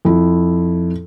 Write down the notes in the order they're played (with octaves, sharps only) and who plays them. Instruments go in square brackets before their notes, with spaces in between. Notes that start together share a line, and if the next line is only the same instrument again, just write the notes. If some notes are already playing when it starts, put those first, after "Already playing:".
[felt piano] F2 E4